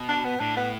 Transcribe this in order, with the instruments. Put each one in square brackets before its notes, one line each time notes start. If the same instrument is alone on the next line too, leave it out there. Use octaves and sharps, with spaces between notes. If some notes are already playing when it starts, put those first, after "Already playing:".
Already playing: [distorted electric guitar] B2
[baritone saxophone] D4
B3
[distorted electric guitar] A2 [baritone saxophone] D4
[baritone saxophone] B3